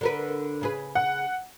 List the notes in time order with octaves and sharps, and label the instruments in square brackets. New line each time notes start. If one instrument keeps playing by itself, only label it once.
[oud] D3 A#4 B4
C#3 G#4 B4
[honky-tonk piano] F#5